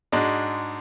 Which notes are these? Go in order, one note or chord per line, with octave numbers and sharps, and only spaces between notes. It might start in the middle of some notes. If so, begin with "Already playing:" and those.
G#2 G#3 D4 F#4